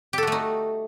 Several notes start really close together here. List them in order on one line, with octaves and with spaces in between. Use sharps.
G4 A4 F#4 A3 D#4